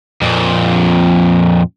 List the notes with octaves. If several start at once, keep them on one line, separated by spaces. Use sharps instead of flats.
F2 A#2